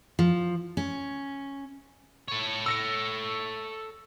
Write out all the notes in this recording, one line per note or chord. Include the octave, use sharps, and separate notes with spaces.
F3
C#4
A4 C#5
E6 A#6 C#7